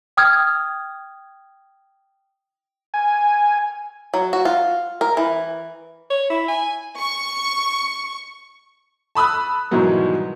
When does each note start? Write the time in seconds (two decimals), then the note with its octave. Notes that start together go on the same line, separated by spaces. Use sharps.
0.17 G5 D#6 F6 G#6
2.94 G#5
4.14 F#3
4.33 F#4
4.45 F4
5.01 A#4
5.17 E3
6.10 C#5
6.30 E4
6.48 G#5
7.00 C#6
9.15 A5 B5 D#6 E6 F#6
9.71 G#2 B2 D#3 E3 F#3 G3